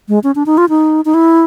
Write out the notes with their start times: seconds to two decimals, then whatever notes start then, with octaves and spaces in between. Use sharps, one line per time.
0.09 G#3
0.24 C#4
0.35 D4
0.46 D#4
0.58 F4
0.69 D#4
1.05 D#4
1.14 E4